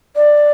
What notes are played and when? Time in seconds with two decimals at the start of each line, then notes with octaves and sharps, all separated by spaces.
0.16 D5